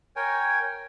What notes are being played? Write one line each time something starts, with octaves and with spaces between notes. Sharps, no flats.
A#4 C#5 G5 G#5